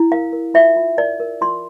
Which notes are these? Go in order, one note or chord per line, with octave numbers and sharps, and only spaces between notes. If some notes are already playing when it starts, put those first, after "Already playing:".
Already playing: E4
A#4 F5
A#4
F4 E5
F4
A#4 D5
A#4
F4 C6